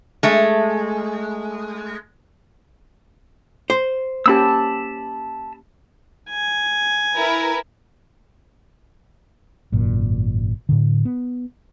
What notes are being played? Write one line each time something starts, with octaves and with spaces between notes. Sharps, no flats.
G#3 A3
C5
A#3 C#4 G4 A5 B5 E6
G#5
E4 A#4 B4
G#1 F#2 A#2
A2 D3
B3